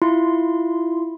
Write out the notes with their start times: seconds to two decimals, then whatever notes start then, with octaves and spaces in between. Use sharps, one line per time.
0.02 E4 F4 C6